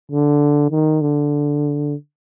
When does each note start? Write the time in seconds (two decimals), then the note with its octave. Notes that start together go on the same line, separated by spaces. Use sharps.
0.11 D3
0.71 D#3
1.01 D3